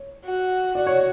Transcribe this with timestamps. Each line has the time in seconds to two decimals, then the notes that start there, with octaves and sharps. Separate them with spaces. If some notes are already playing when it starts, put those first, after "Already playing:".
Already playing: C#5
0.25 F#4
0.74 F#4 D5
0.87 C#5